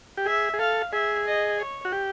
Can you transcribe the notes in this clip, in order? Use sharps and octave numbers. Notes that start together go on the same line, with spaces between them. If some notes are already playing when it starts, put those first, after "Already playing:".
G4
G#4 E5
G#4
A4 F5
G#4 E5
D#5
C#5
F#4
G4